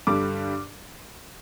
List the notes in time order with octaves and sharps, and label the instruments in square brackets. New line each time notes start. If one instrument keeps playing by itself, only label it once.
[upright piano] G2 D3 G3 D6